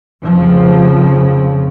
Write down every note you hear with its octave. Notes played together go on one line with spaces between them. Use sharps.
F1 F2 C#3 F3